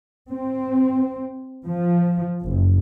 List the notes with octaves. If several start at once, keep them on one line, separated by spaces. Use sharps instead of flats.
C4
F3
F#1